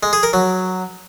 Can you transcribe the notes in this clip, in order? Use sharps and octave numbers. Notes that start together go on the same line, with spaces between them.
G#3
G#4
A#4
F#3